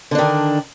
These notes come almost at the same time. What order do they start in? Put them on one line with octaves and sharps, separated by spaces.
D3 D4 D#3